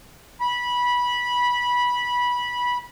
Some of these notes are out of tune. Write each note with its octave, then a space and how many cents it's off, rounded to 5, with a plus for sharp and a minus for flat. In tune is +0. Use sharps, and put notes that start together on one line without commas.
B5 -15